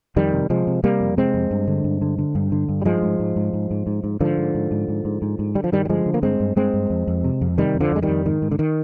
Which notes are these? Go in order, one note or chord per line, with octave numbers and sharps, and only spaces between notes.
F2 D#3 G3
C3
C3 F3 G#3
C3
C3 G3 A#3
F2
C3 G#3 C4
F2
G2
D3
G2
D3
D3
G2
D3
G2
G3
G#2 F3 G#3
G#2
G#2
G#2
G#2
G#2
G#2
G#2
G#2 D3 F3
G#2
G#2
G#2
G#2
G#2
G#2
G#2
D3 G3
F3
G2 D#3 G3
G3
D3 F3 G#3
D3
A#3
G2 G#3 C4
G2
G2 G#3 C4
G2
F2
F2
C3
F2
C3 D#3 G3
F2
D3 F3
F2 G#3
D#3 G3
F2
G#2 D#3
G#2
D3
D#3